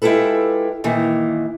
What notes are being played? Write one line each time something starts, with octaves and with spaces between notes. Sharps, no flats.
G#3 E4 F4 G4 A4 B4
A#2 D#3 E3 A#3